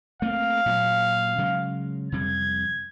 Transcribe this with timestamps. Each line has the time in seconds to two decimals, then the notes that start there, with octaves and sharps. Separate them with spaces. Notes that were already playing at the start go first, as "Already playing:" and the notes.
0.22 A3 A#3 C4 F5
0.66 A#2 F#3
1.38 C#3 F#3 G#3
2.12 F2 C3 G3 G#6